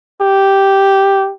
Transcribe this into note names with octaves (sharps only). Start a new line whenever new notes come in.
G4